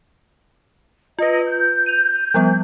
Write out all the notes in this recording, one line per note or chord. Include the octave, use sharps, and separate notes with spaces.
F4 B4 D#5
G6
D#7 F7
F3 G3 B3